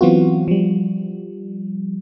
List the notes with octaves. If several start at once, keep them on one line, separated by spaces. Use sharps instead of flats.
E3 F#3 B3 C4 F4 F#4
F3 G3